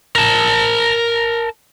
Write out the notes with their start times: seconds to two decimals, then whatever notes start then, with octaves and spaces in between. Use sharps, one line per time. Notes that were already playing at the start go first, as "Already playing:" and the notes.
0.16 A#4 A5